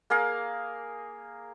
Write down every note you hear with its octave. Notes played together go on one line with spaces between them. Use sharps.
A#3 G#4 A#4 F5